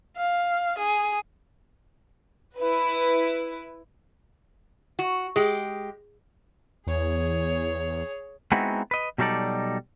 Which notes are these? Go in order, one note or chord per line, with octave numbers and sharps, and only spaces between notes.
F5
G#4
E4 B4
F#4
G#3 G4 G#4
E2 G#4 C#5
G#3 B3 C4 D#4 E4 F#4
B4 D#5
B2 F#3 G3 D#4 A4 D5